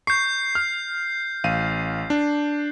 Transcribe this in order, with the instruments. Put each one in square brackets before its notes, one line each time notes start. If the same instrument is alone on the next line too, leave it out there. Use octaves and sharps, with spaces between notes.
[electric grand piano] C#6 [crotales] G6 C7
[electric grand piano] F6
A1 F5 D#7
D4